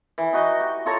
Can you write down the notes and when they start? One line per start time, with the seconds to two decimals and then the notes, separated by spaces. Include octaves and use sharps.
0.18 E3
0.33 D#4 F#4 D#5
0.61 G4
0.86 F4 A4 C#5 A#5